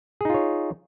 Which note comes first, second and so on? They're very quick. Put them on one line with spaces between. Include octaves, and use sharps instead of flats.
G#4 D#4 F4 C#5